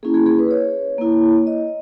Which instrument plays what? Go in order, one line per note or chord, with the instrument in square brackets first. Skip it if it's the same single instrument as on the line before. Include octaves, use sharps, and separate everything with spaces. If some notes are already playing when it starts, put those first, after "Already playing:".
[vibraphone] A#3 C#4 E4 G#4
G#4
G#4
B4
C#5
A#3 E4
D#5